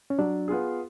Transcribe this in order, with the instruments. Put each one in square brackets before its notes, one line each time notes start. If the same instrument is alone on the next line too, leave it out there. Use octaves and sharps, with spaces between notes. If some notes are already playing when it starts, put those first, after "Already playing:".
[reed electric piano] C#4
[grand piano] F#3 [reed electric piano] D4
[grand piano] B3 F4 G#4